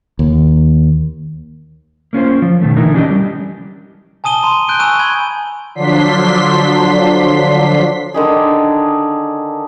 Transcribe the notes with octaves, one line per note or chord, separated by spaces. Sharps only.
D#2
A#3 C#4 F4 C5
F3
B2 D#3 A3
D3 E3 D#4 E4 A#4
C#4 D4 G4 C#5 D#5
G3
G#5 A5 D#6 D#7 G7
A#5 C6
F#6 G6 D7 D#7 G7
G#5 A#5 C#6 E6 G6 D#7
G#5 B5 G#6 G7
D3 F3 F#3 D4 C6 B6
D3 D#3 G#4